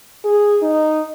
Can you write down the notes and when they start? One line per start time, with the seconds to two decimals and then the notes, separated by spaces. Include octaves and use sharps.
0.25 G#4
0.62 D#4